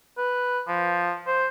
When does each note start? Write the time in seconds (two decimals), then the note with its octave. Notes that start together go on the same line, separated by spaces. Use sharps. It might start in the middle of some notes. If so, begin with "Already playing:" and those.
0.17 B4
0.68 F3
1.27 C5